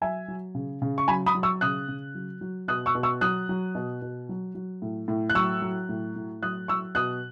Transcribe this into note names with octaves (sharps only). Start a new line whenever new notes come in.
F#3 E5 G#5
F#3
C#3
C#3
C#6
F#3 G#5 B5
B5 D#6
F#3
C#6 E6
C#3 D#6 F#6
C#3
F#3
F#3
B2 D#6 F#6
C#6 E6
B2
C#6 E6
F#3 D#6 F#6
F#3
B2
B2
F#3
F#3
A2
A2
F#6
F#3 C#6 E6
F#3
A2
A2
F#3 D#6 F#6
F#3 C#6 E6
B2 D#6 F#6